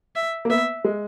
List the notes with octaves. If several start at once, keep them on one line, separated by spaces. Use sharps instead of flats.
E5
A#3
B3 E5
G#3